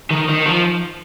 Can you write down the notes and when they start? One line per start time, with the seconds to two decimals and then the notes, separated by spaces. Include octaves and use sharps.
0.11 D#3
0.29 D#3
0.46 F3